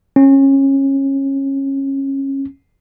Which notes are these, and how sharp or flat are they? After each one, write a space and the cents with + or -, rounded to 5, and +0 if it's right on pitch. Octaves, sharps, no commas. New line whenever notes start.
C#4 -25